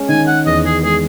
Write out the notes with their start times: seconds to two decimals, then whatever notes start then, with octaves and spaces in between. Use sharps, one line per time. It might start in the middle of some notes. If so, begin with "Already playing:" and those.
Already playing: G#3 C#4
0.09 D#3 G#5
0.27 F#5
0.46 E2 D#5
0.65 G#4
0.83 G#3 G#4